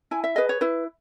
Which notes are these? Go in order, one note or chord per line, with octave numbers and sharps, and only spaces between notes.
E4 G#5
E5
G#4 B4 D#5
C#5
E4 B4